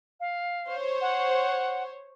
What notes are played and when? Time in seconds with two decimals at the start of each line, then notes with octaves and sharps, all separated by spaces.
0.20 F5
0.68 C5 C#5
1.01 F#5